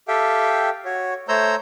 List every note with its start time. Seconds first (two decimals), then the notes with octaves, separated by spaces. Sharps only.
0.08 G4 A4 E5 F5 G5
0.85 F#4 C#5
1.29 A3 C5 C#5 A#5 E6 G6